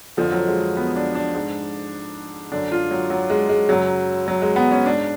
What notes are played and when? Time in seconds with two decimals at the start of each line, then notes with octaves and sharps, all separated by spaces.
0.17 F2 D3 F3
0.32 F#3
0.47 G#3
0.77 B3
0.96 D4
1.15 D4
1.34 G#2
2.52 F#2 D3 D4
2.72 F4
2.91 F#3
3.10 F#3
3.30 G#3
3.49 G#3
3.68 F#2 C#3 F#3
4.28 F#3
4.42 G#3
4.56 B3
4.72 C#4
4.86 G#2 D4